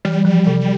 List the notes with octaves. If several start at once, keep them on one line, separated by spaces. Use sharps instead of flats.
E3 G3
F3
C3